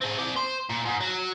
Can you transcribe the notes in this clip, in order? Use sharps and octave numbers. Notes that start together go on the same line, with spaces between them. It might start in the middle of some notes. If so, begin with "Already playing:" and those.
C4 G#4
C4 D5
C5
A#2
G#2
F#3